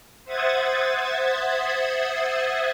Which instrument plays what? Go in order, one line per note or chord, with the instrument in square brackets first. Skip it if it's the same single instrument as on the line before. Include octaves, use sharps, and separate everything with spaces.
[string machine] C5 E5 F#5 D#6 G#6 A6